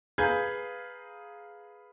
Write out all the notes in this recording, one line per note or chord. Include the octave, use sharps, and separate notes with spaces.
G#4 B4 F5 A#5 G6 G#6